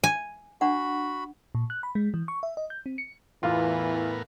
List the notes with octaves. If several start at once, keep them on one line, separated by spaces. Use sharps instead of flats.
G#5
D4 F#4 F#5 B5
A#2
F#6
B5
G#3
E3
C#6
E5
D#5
G6
C4
C#7
E2 A2 E3 B3 F4 A#4